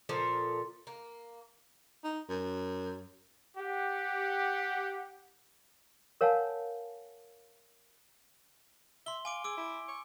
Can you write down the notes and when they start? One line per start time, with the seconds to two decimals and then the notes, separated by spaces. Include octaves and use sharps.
0.09 A#2 F3 A4 A#4
0.87 A#3
2.04 D#4
2.29 F#2
3.57 G4 F#5
6.21 A#4 C#5 F5 F#5 G#5 A5
9.06 E5 C6 G7
9.25 F5 G#5 D6 D7
9.44 G#4 D6 E6 D7
9.57 E4
9.89 C#6